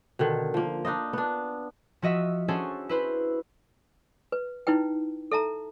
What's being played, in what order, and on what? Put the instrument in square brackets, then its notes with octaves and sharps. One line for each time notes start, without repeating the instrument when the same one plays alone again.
[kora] B2 D3 D#3
F3 A#3
D4 D#4 F4 D#5
B3 D4
[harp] F3 F#4 D#5 E5
C#4 D4 F#4 G#4 A4 C5
E4 B4 C5
[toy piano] B4
D#4 E4 B4 G5
A4 E5 A5 A#5